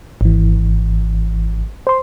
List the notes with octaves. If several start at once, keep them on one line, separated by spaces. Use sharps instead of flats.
G#1 E3
C5 C6